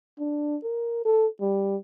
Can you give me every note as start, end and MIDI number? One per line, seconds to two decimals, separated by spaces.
0.19 0.56 62
0.63 1.02 70
1.05 1.27 69
1.40 1.76 55